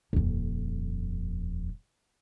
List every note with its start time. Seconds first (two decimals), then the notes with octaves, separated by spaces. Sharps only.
0.13 D#1 F2